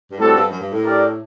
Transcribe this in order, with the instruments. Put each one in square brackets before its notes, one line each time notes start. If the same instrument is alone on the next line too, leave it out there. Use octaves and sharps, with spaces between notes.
[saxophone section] G2
[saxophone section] A2 [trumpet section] G3 C4 F#4 A4
[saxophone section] G2
F#2
G2
A2
[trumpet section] D4 G4 A#4 D5